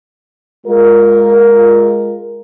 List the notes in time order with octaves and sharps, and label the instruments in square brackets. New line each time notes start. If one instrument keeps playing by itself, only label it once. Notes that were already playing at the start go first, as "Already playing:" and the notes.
[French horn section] G#3 F4 A#4